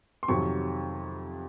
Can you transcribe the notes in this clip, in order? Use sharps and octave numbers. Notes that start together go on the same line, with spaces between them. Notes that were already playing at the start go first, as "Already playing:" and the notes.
C6
F2 C3 D#3 F#3 C4 C#6